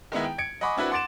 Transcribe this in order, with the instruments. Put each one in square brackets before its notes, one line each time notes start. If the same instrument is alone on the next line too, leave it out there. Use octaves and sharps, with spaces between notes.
[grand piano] D#3 G#3 B3 E4
G5
G#6 C#7 D7
D#5 F#5 G#5 B5 C#6 D6
C4 D4 E4 F#4 B4
F#5 C6 D6 A6 D7 E7